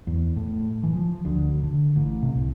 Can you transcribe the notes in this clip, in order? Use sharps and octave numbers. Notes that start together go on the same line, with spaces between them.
E2
A2
E3
F3
D2
D3
A1
C3
C2